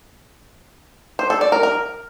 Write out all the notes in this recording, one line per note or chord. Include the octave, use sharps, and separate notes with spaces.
C5
A4
D5
A#4
A#4